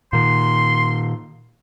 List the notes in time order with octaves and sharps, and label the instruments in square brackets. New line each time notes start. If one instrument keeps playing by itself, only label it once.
[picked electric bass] A#2 D#3 [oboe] C6